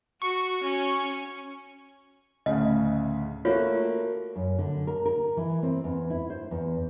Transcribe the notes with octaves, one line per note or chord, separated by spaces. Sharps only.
F#4 C#6
C#4
D2 A2 C#3 D#5
A3 A#3 F4 F#4 C#5
F#2
D3
A#4
A#4
E3
C4
E2
E4
C5
E2